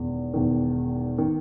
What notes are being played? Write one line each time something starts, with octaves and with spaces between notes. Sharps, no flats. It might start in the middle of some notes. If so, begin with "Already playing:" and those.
Already playing: E1 E2 D#3
E1 E2 D#3
D#3